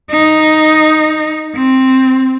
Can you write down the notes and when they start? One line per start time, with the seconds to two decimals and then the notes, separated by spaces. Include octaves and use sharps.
0.11 D#4
1.56 C4